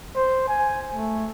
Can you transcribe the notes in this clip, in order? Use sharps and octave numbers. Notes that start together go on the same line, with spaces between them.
C5
G#5
A3